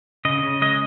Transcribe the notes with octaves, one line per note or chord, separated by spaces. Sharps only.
C#3 D#5
C#3
G#3 D#5